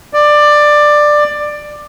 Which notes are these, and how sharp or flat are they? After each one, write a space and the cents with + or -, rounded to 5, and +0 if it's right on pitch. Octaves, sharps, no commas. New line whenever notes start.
D5 +15